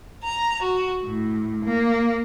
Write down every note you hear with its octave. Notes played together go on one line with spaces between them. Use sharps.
A#5
F#4
A2
A#3